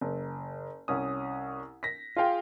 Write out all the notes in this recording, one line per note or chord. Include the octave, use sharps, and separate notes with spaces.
F#1
C2 C#4 D#6
A#6 B6
F4 G#4 F5 G5